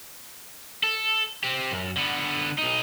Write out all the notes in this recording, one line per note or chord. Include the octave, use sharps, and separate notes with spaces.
A4
C4 G4
F#2
D3 B3
B1 D#4